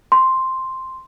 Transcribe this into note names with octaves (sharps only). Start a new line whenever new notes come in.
C6